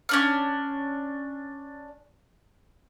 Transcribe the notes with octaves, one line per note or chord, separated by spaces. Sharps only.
C#4 D4 F6